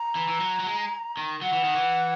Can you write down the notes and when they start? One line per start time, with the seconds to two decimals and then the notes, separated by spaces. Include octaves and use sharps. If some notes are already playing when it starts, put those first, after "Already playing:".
Already playing: A#5
0.15 E3
0.28 E3
0.40 F#3
0.59 F#3
0.66 G#3
1.17 D#3
1.42 F#3 F#5
1.53 E3
1.64 D#3
1.76 E3